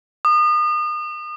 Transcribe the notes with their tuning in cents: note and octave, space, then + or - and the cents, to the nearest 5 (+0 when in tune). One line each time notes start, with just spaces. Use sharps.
D#6 -35